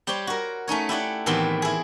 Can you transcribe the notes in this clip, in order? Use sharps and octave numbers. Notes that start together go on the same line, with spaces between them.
G3 G4 C5 C#5 G5
F#4 A#4
A3 C#4 D#4 C#5
E4 G4 D5 F#5
A2 D#3 E3 B3 C4 G4
E4 G#4